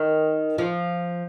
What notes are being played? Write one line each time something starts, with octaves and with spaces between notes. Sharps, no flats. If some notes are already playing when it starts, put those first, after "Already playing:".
Already playing: D#3
F3